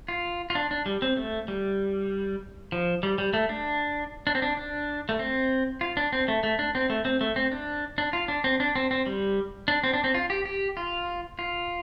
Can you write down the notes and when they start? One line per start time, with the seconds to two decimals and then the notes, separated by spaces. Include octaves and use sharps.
0.08 F4
0.50 F4
0.55 D4
0.71 D4
0.86 G3
1.02 C4
1.17 A3
1.48 G3
2.72 F3
3.03 G3
3.18 G3
3.33 A3
3.49 D4
4.27 D4
4.35 C4
4.42 D4
4.57 D4
5.09 A3
5.19 C4
5.81 F4
5.97 D4
6.13 C4
6.28 A3
6.43 A3
6.59 D4
6.75 C4
6.90 A3
7.05 C4
7.21 A3
7.36 C4
7.52 D4
7.98 D4
8.13 F4
8.28 D4
8.44 C4
8.60 D4
8.75 C4
8.91 C4
9.06 G3
9.68 D4
9.84 C4
9.93 D4
10.04 C4
10.14 F4
10.30 G4
10.46 G4
10.77 F4
11.39 F4